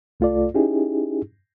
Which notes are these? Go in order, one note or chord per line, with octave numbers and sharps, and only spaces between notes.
C2 A3 F4 A4 D5
C#4 D#4 E4 G4 G#4